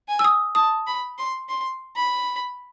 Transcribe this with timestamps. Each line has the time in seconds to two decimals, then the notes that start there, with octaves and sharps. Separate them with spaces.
0.09 G#5
0.19 E6
0.24 D#6
0.55 A5 D#6
0.87 B5
1.18 C6
1.49 C6
1.96 B5